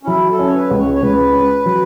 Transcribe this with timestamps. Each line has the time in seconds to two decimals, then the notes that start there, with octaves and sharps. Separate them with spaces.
0.03 C#4
0.07 F#3 E4
0.31 A4
0.39 C#4
0.48 C#5
0.54 B4
0.71 C#2
0.78 C#5
0.94 C#5
1.02 C#2 B4
1.33 C#4
1.66 F#3